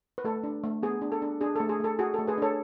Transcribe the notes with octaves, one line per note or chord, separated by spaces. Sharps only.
B4
A3 A4
D4
A3
B3 G#4
D4
A4
D4
D4 G#4
A3 A4
G#4
A3 A4
F#4 G#4
A3 A4
G#4 B4
D4 A4 C#5